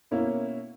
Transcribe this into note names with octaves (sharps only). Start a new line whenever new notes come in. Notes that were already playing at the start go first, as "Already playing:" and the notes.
B2 A#3 C#4 E4